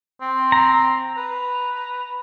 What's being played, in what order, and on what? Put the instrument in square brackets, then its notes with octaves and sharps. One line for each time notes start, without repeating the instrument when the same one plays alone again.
[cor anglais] C4
[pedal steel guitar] A#5
[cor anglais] B4